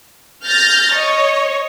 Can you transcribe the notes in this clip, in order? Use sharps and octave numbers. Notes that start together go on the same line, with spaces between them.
F6 G6 A6 A#6
C#5 D#5